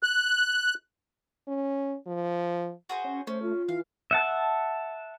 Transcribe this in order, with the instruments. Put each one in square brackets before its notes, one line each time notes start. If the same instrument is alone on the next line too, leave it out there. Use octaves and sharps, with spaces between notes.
[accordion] F#6
[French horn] C#4
F3
[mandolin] F#4 G#4 C5
[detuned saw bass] C#4
[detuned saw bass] A3 [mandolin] C#4 [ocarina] C5
[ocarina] F4
[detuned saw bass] E3 [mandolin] F5
[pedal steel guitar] E5 F#5 A5